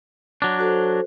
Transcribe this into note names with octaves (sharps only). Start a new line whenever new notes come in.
F#3 D4
F#4 A4 C5